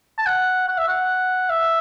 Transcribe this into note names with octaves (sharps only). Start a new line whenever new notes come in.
A5
F#5
F#5
E5
F#5
E5